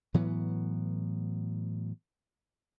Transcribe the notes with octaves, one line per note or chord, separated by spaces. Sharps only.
A2 E3 F#3 B3